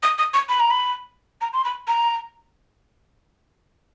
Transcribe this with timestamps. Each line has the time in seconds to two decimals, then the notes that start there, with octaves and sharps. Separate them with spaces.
0.03 D#6
0.18 D#6
0.34 C#6
0.49 B5
0.60 A#5
0.70 B5
1.41 A#5
1.53 C6
1.64 B5
1.88 A#5